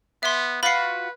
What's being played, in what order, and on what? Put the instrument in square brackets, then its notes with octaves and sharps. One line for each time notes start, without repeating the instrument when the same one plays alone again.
[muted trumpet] B3 [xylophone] E5 C6
[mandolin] F4 F#4 [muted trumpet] B4 [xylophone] B5 C7